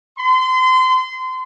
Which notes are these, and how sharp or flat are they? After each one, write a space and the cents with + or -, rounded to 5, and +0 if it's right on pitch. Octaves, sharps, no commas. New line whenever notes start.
C6 -30